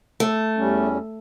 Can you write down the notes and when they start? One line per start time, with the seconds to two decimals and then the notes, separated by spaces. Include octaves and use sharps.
0.20 A3
0.57 E2 G3 C#4